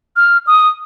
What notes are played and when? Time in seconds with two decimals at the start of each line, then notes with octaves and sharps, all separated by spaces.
0.16 F6
0.47 D#6